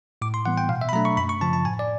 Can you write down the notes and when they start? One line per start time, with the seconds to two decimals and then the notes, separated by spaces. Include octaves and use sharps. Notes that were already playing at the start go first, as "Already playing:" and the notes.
0.22 A2 D6
0.34 C6
0.46 E3 G3 B3 F#5
0.58 G5
0.69 B2 F5
0.81 E5
0.89 B5
0.93 F#3 A3 D4 A#5
1.05 C#6
1.17 F#2 B5
1.29 C#6
1.41 C#3 F3 A5
1.53 A5
1.65 A2 G#5
1.79 D5